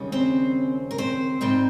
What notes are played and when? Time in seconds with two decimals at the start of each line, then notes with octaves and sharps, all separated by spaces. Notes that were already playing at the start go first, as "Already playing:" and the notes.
Already playing: D#2 C#3 G3 C#4
0.12 C4 C5
0.91 A#4
0.98 C4 C5
1.41 G#2 G3 C4 D#4